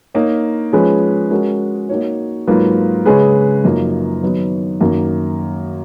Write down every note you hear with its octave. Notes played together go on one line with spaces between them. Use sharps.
A#3 D#4 A#4 C#5
F3 G#3 C#4 G#4 B4
G#3 C#4 F#4 A#4
A#3 D#4 F#4 C#5
G#2 F#3 A#3 F4 B4
C#3 G#3 C#4 G#4 B4
F#2 F3 A#3 D#4
D#3 F#3 B3 D#4
F#2 D#3 A#3